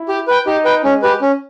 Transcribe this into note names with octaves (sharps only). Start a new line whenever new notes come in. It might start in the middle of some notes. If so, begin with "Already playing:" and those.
Already playing: E4
G4
B4 G5
D#4 G4
B4 G5
G#3 C#4
G4 B4
C#4